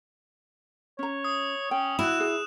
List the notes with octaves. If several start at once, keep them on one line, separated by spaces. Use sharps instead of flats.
C#4 C#5 A#5
D#6
C#4 G5
E4 F#4 F#6 E7
G#4